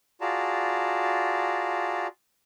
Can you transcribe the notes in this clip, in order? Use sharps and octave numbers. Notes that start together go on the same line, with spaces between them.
F4 F#4 G#4 D5 A5 A#5